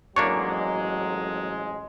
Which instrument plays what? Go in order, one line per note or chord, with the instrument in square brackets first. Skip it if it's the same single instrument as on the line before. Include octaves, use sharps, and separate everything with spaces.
[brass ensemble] A1 F2 G#3 [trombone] F#3 [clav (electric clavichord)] A#3 D4 C#5 [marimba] C#6